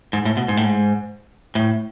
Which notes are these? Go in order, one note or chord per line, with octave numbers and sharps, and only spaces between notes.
G#2
A2
B2
G#2
A2
G#2
A2